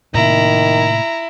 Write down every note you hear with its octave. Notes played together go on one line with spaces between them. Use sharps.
A2 C3 D#3 A#3 E4 A#5